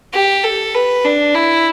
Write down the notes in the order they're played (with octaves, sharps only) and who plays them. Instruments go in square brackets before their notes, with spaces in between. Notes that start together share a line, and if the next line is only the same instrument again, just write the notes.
[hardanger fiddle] G4
A4
B4
D4
E4